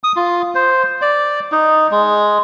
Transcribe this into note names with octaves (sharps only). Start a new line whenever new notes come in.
D#6
F4
C5
D5
D#4
G#3